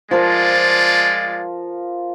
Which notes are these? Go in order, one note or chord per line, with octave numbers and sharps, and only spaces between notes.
F3 G#3 F4 A#4 D5